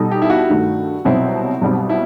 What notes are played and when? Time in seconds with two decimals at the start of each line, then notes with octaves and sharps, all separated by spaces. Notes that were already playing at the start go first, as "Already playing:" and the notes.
Already playing: B2 G3 D#4 A4
0.11 G4
0.22 E4
0.30 F#4
0.49 G2 D#3 A3
1.05 C2 B2 F#3 C4 E4
1.61 B1 B2 G3 C4
1.89 E4